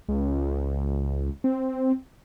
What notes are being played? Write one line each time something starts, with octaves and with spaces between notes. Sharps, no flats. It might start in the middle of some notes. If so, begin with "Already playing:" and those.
C#2
C4